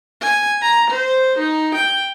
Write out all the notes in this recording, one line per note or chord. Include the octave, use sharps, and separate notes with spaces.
G#5
A#5
C5
D#4
G5